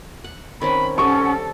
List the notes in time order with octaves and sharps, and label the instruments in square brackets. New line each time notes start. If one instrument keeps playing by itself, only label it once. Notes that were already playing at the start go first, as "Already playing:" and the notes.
[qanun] F#5
[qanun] D#3 C4 C#4 [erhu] B5
[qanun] G3 G4 D#5 [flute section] C#4 F#5 [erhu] A4 [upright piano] C#6